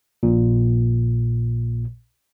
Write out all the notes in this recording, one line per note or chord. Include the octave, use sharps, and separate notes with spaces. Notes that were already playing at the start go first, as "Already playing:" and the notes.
A#1 A#2